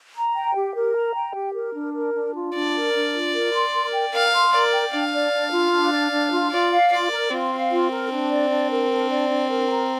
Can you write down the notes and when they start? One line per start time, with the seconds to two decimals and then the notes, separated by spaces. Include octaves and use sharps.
0.15 A#5
0.35 G5
0.55 G4
0.75 A#4
0.95 A#5
1.14 G5
1.34 G4
1.54 A#4
1.74 D4
1.94 A#4
2.14 D4
2.35 F4
2.54 D4 D5
2.73 A#4
2.94 D4
3.14 F4
3.34 A#4
3.53 C6
3.73 A#4
3.93 G5
4.12 A#4 F5
4.33 C6
4.52 A#4 D5
4.73 G5
4.92 D4 F5
5.13 D5
5.32 D4
5.52 F4
5.72 D4
5.92 D5
6.12 D4
6.32 F4
6.51 F4 D5
6.71 F5
6.91 F4 D5
7.11 A#4
7.31 C4 F4
7.51 F5
7.71 F4
7.91 A#4
8.10 D4
8.30 D5
8.50 D4
8.70 A#4
8.90 D4
9.09 D5
9.29 D4
9.50 A#4
9.70 A#5